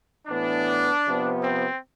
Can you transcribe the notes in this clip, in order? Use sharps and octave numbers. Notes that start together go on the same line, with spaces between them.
A2 E3 B3 D4
C3 F3 B3
C4